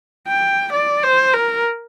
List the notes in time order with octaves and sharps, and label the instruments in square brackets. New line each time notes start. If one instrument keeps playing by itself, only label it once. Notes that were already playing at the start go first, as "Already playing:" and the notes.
[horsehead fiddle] G5
D5
C5
A#4